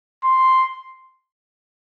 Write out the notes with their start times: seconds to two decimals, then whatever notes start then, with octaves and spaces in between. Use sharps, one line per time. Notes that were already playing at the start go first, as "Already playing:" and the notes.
0.24 C6